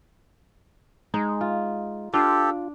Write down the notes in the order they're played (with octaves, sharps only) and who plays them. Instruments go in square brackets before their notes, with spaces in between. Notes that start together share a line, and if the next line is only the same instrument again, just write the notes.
[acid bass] G#3 [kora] D#4
[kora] F4
[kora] D4 [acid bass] F4 [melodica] G4 A4